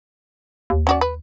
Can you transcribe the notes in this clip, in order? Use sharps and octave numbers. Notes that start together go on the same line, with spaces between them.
D#2
C#4 F#4 D5
B4